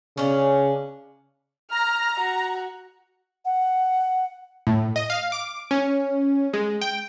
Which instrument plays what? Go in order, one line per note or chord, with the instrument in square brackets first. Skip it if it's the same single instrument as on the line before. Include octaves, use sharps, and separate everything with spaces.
[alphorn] C#3 [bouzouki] C#4 D4
[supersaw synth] A#5 [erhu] F6
[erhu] F#4
[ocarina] F#5
[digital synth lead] A2
D#5
F5
D6
C#4
G#3
G5